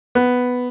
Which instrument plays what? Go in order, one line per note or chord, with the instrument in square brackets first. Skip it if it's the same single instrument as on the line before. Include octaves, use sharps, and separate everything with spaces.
[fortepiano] B3